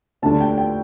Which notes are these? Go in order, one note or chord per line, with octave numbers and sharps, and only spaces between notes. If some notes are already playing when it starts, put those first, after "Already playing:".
D2 D3 G3 D4 A5
G5
G5